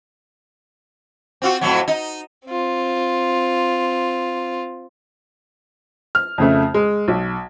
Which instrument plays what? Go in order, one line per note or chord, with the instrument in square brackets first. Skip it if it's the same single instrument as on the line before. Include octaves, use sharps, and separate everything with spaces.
[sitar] C4 F4 F#4
F2 A2 F#3
D#4
[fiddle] C4 F4
[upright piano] F6
F2 C#3 A3
G#3
B1